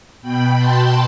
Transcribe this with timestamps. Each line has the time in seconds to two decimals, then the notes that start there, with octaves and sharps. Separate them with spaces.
0.21 B2 G5 B5
0.56 A5 C6